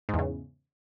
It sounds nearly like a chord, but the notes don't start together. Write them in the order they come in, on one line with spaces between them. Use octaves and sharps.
G#2 E2 C#3